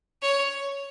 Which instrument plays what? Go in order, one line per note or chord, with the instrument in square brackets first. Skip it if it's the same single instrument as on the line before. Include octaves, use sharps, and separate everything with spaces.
[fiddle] C#5